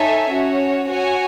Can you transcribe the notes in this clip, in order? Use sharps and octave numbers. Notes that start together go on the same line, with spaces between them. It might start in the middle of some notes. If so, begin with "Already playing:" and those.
Already playing: D#4 A4 C#5 E5 G#5
C#4 F#4 C#5
F#4 C#5 G#5